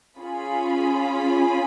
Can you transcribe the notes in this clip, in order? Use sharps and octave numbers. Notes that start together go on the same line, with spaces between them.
C#4 F4 G#4 B5